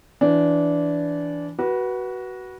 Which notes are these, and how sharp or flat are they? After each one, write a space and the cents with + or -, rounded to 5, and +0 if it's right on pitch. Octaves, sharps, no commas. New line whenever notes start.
E3 +10 D4 -15
F#4 +15 B4 -20